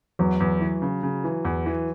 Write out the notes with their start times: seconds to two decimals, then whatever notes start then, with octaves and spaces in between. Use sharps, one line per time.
0.19 E2 F#3
0.40 E2
0.61 E3
0.82 C#3
1.03 C#3
1.24 E3
1.45 E2
1.66 E3